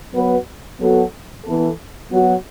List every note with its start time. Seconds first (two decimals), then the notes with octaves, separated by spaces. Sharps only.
0.13 F#3 B3 F#4 B4
0.79 F#3 B3 F#4 A4
1.45 E3 B3 E4 A4
2.11 F#3 B3 F#4